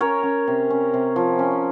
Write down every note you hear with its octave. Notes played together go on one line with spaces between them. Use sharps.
C#4 A#4 C#5
C#4
C3
C#4
C3
F3
C#4